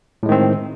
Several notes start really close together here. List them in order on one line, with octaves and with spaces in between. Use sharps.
A2 G#3 D#3 C4